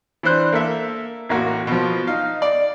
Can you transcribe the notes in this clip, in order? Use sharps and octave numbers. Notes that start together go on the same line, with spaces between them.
E3 D4 C5 F#6
A#3 A4 E5
A1 A#3 F#4
B2 F3
D#4 F5
D5